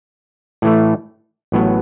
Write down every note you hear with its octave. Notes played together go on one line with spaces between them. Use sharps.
A2 E3 A3
A1 A2 F#3 B3